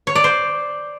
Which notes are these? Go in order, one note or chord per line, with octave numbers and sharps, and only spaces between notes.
C#5
D5
C5